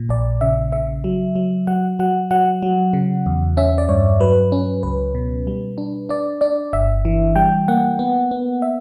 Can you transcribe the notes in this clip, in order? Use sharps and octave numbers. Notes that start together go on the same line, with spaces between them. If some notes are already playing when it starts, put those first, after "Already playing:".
Already playing: A#2
A#1 D5
C#3 E5
C#3 E5
F#3
F#3
F#3 F#5
F#3 F#5
F#3 F#5
F#3
C#3
E2
C#4 E5
D5
G2 C#5
F#3 B4
C#4
C#2 B4
B2
G3
D4
D4 D5
D4 D5
G1 E5
E3
G3 G5
A#3 F#5
B3
B3
E5